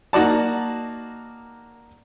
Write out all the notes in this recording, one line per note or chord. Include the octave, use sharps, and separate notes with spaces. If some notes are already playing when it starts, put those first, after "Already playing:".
A#3 D#4 F#4 D5 A5